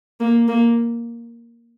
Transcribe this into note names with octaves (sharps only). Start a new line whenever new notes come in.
A#3
A#3